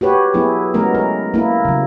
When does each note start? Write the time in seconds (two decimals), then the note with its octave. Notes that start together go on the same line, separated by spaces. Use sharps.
0.01 F#4 G4 B4 C#5
0.34 F#3 B3 E4 G#4
0.74 F#3 G#3 A3 B3 C#4 A#4
0.95 A#4
1.34 A#3 E4 A#4
1.65 C#3 F#3